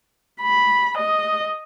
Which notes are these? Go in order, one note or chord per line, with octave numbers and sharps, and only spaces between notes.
B5
D#5